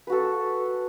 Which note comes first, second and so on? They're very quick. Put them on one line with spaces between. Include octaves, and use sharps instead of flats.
B4 F#4 A4